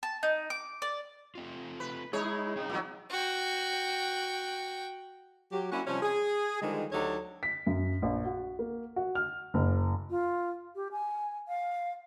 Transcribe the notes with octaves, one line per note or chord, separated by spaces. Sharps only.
A5
D#4
D6
D5
A3 C4 F4
B4
G#3 D#4 E4 G#4 C#5
C#3 C4 D#4 E4 G5
A#2 F#3
F#4 G5
F#3 G4
A#3 C#4 D4 E4 F#4
C3 F3 G3 C#4
G#4
D3 D#3 F3 G3 G#3
D2 F#3 D#4 G4 A4 C#5
B6
F#2
A#1
F#4
A#3
F#4
F6
F#1
F4
G4
G#5
F5